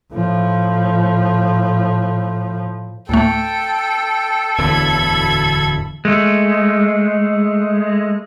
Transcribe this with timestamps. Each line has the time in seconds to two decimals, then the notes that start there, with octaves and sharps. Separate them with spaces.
0.12 A2 F3
3.09 D2 A2 A3 A4 G5
4.58 D1 E2 D3 B5 G#6
6.05 G#3 A3